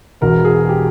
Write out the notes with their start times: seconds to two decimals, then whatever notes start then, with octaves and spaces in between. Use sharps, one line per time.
0.21 E1 E2 B2 A#4
0.45 G#4
0.69 G4